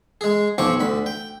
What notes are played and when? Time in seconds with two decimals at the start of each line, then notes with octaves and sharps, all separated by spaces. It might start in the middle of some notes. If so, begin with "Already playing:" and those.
0.21 G#3 G#4
0.58 B1 F3 C4 G#5 C#6 D6
0.80 D2 B5
1.06 G5